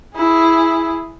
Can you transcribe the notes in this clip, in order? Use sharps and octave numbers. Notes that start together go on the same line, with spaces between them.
E4 G#4